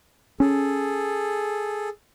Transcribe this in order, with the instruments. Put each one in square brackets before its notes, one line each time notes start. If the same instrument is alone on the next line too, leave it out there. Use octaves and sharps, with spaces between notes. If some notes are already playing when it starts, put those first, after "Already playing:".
[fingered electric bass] C#4 [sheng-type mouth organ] G#4 A4